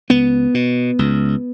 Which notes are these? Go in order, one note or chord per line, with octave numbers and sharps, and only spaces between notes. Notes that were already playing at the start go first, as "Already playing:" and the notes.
C#2 B3
B2
C#2